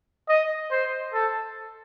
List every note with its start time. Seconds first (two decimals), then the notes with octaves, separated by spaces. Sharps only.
0.29 D#5
0.71 C5
1.13 A4